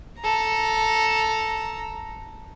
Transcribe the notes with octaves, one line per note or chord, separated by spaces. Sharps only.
A4 A#5